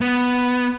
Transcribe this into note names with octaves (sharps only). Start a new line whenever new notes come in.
B3